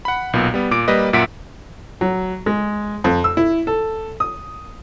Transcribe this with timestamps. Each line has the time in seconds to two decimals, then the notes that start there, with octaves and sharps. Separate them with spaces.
0.05 F#5 B5
0.33 B1 A#2 B3
0.54 G3 B3
0.71 A#2 D6 D7
0.88 G3 A#3 B4 D#5
1.13 F#2 A#2 E5 F#5 B6 D7
2.01 F#3
2.46 G#3
3.04 F2
3.24 E6
3.37 E4
3.67 A4
4.20 D#6